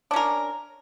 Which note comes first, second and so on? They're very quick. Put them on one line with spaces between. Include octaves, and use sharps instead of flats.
D4 C#4 A#4